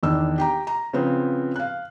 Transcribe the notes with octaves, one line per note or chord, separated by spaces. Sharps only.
E2 D#3 D4 E6
G4 G5 A#5
A#5
C#3 F3 B3 C4
F5 F#6